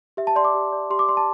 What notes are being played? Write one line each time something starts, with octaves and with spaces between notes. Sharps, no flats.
G4 E5
A5
D5 C6
D6
G4
D5
G4 C6
D6
D5 C6
A5